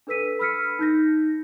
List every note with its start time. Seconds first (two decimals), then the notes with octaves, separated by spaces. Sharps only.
0.07 D4 A4 B4 E6 B6 D#7
0.39 B5 E6 F6 B6 C#7
0.79 D#4 G6 A#6